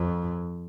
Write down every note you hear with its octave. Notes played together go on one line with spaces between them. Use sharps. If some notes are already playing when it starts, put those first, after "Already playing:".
Already playing: F2